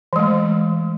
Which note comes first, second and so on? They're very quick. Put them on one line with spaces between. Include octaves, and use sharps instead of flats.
E3 G#3 A3